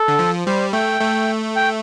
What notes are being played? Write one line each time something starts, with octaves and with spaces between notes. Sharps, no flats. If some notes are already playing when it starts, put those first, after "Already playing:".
Already playing: A4
D3
F3
G3 C5
A3 G5
A3
G5